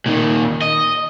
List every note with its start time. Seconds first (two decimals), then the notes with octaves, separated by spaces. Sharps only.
0.06 A#2 D#3
0.61 D#5